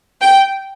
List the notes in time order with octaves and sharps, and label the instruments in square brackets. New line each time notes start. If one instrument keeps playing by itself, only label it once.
[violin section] G5